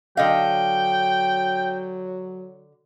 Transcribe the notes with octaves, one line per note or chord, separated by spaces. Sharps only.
D3 F#3 D#5 F5 G5